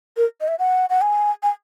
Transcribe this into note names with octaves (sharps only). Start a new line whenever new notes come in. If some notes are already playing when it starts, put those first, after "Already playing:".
A#4
D#5
E5
F#5
F#5
G#5
G#5